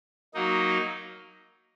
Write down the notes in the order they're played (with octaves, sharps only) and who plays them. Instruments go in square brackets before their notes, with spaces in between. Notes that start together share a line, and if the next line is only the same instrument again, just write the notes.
[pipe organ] F#3 A#3 D#4